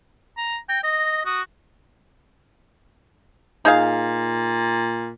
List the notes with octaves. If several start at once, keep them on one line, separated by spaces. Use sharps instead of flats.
A#5
G5 A#6
D#5 A#6
F#4 D#6
A#2 D#4 G#4 F5